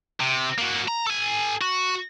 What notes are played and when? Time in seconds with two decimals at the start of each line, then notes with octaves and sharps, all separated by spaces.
0.20 C3
0.58 A#3 F#4
0.88 A#5
1.06 A4 G#5
1.62 F#4